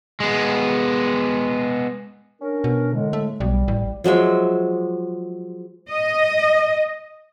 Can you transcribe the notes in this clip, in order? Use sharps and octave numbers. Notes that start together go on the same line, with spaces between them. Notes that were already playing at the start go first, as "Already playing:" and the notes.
G#3 B3
C#4 D4 A#4
B2
A2 D3 G#3
A3
B1 G3
A1
F3 F#3 G#3 E5
D#5